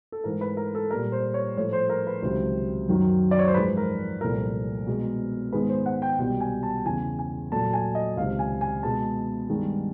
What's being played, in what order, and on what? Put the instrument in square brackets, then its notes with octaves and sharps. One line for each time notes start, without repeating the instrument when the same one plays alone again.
[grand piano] A4
G#2 E3 A3 A#4
B4
A#4
A4
A#2 G3 A#3 A#4
C5
C#5
A2 F3 A3 C#5
C5
A#4
B4
C#2 C3 D#3 F#3 C5
F#2 D#3 F#3
D5
C#5
C5
G#2 F3 G#3 B4
A#4
C2 A#2 F3 A3 A#4
B2 G#3 B3
G#2 D#3 G#3 B3 B4
C5
F#5
G5
C2 B2 G3 G5
G#5
A5
E2 C#3 E3 G#5
G#5
A#2 F#3 A3 A5
G#5
D#5
C#2 C3 D#3 F5
G#5
G#5
B2 G#3 B3 A5
G2 D#3 G#3 B3